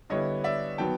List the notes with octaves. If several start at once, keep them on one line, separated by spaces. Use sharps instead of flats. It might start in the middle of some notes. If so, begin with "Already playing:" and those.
D3 G3 B3 E4 C#5 D#5
D5 E5
D#3 F#3 B3 G5 A5